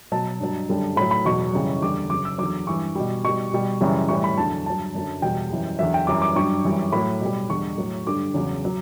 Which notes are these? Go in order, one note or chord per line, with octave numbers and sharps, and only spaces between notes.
B2 F#3 A5
G2 F#3
F#2 D3 G3
A2 F#3 B5
B5
E2 B2 F#3 C#6
F#2 C#3 E3 G3
E2 D3 G3 D6
F#2 C#3 F#3 D6
E6
E2 D3 F#3 D6
G2 E3 G3 C#6
B2 G3
B2 G3 C#6
B2 G3
F#2 C#3 E3 G3
A2 E3 G3 C#6
B5
E2 D3 F#3 A5
G2 F#3 A5
F#2 D3 F#3
E2 B2 G3 G5
F#2 E3 G3
E2 D3 F#3 E5
G5
F#2 E3 G3 D6
D6
G2 F#3 C#6
F#2 E3 G3
A2 F#3 B5
B2 G3
E2 D3 G3 C#6
A2 F#3
G2 D3 G3 D6
E2 C#3 F#3
F#3